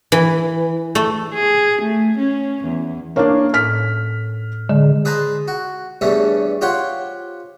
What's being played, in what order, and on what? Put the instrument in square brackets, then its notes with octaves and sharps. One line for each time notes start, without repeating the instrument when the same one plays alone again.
[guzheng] E3
A3
[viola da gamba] G#4
A3
C#4
E2
[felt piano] A#3 D4 [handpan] C#4 C#5 F5
[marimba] A2 [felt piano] F6 B6
[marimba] D3 [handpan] G#3
[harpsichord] G#4 B4 C5 A5 A#5
F#4
E2 G2 A3 C#4
F4 G4 C5 C#5 F#5